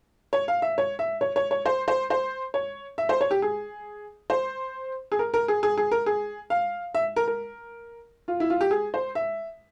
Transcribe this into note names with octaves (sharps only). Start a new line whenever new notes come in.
C#5
F5
E5
C#5
E5
C#5
C#5
C#5
C5
C5
C5
C#5
E5
C5
C#5
G4
G#4
C5
G#4
A#4
A#4
G#4
G#4
G#4
A#4
G#4
F5
E5
A#4
A#4
F4
E4
F4
G4
G#4
C5
E5